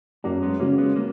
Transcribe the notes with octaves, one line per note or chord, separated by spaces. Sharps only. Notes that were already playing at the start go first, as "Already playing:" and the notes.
F#2 F#3 A#3
G#3 B3
C#3 F#3 A#3 C#4
G#3 B3
A#3 C#4